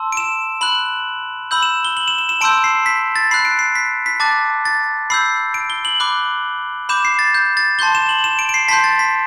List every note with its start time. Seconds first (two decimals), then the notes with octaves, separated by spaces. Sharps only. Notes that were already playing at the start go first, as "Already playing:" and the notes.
Already playing: A5 C6 E6
0.12 D7
0.17 E7
0.61 B5 F#6 F#7
1.51 B5 E6 G6 F#7
1.63 E7
1.85 G7
1.97 F#7
2.08 E7
2.18 E7
2.29 E7
2.41 A5 C6 E6 G6 D7
2.64 C7
2.86 B6
3.16 A6
3.31 B5 F#6 C7
3.45 D7
3.59 C7
3.75 B6
4.06 B6
4.20 A5 D6 F#6 A6
4.65 A6
5.10 B5 E6 G6 C7
5.54 D7
5.70 G7
5.85 F#7
6.00 B5 D6 F#6
6.89 B5 D6 G6 E7
7.05 C7
7.19 A6
7.34 G6
7.57 A6
7.79 A5 C6 G6 G7
7.95 E7
8.09 F#7
8.24 E7
8.39 D7
8.49 D7
8.54 C7
8.68 A5 C6 G6 B6
8.84 A6
8.99 B6